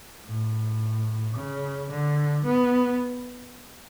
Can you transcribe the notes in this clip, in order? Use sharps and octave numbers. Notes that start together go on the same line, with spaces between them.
A2
C#3
D3
B3